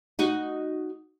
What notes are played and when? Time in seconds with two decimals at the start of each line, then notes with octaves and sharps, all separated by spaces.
0.19 D#4 F#4